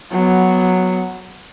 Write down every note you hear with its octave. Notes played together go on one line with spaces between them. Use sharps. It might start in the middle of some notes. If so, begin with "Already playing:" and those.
F#3 B3